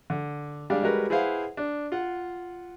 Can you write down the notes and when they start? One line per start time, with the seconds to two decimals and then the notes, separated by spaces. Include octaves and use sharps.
0.10 D3
0.70 G3 G#3 D4 F5
0.83 G3 G#3 F#4 A#4 B4
1.10 E4 G#4 B4 C5 F5 F#5
1.57 D4
1.92 F4 F#5